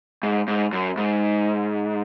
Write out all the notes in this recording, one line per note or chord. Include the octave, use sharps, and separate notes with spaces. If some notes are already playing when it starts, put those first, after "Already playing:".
G#2
G#2
F#2
G#2